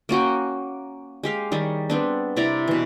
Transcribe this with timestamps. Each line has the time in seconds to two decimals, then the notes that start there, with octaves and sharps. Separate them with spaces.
0.09 A#3 C#4 F#4 G5
1.23 G#3 G4 F5
1.52 D#3 G3 G#4 C#5
1.90 B3 C4 D4
2.36 C3 E4 D5 A#5
2.67 B2 E3